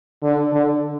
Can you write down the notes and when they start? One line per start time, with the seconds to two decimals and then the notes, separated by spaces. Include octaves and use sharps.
0.23 D3
0.53 D3